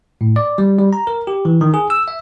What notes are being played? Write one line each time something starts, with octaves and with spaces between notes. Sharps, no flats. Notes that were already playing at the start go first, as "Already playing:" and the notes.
A2
D5
G3
G3
A#5
A#4
G4
E3
D#3
G#4
E6
E5